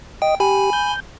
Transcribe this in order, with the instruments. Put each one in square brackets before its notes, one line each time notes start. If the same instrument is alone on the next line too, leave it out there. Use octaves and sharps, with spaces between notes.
[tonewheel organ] D#5 [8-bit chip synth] G5
[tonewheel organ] G4 [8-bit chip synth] G#5 B5
[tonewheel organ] G6